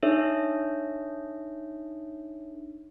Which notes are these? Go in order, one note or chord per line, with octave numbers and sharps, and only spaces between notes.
D4 D#4 A4 C#5 E5